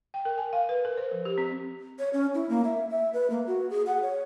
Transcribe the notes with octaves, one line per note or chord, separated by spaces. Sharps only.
G5
A#4
G#5
F5
B4
A#4
C5
F3
G4
C4
C#5
C#4
E4
A#3
E5
E5
B4
A#3
F#4
G#4
F#5
C#5